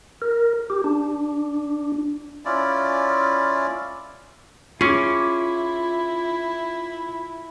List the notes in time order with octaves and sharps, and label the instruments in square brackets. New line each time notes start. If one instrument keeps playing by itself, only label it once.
[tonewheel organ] A#4
G4
D4
[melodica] C#4 E4 F4 D5
[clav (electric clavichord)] C#4 G#4 [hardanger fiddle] E4 [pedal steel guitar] F4 D6 [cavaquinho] C#6